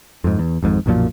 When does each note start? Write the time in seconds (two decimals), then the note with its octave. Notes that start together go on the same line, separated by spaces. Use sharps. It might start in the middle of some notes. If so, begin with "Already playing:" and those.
0.24 F2 G#2
0.39 E2
0.63 G#1 F2 G#2
0.86 B1 F#2 A#2 F3